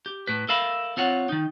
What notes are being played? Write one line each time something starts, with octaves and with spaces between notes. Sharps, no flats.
G4
A2 B4
A4 A#4 E5 F5 B5
C4 F4 C#5 F#5
D#3 D#4